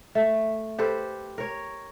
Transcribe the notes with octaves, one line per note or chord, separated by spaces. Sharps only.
A3
G4 A4 B4 C5
A#4 C#5